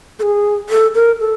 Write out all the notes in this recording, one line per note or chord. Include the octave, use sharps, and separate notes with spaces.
A4
G#4
A4
A#4
A4